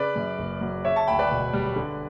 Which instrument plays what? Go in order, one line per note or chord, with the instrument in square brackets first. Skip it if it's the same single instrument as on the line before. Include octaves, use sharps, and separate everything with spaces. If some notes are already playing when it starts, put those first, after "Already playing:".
Already playing: [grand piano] C#3 B4 D5
F#2
F#1
F#3
C#3 C#5 E5
A5 C#6
D2 G5 B5
B4 D5
E1
G3
D3